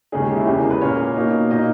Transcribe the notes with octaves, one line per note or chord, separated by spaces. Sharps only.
D#2 C#3 G#3 C#4 G#4
G4
E4
E2 C#3 G#3 G4
A#4
B4
A#2 A#3 C#4 C#5
B2 A#3 D#4
A#2 A#3 D#4 D#5